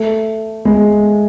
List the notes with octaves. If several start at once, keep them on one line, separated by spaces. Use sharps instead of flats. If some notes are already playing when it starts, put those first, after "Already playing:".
Already playing: A3
G#3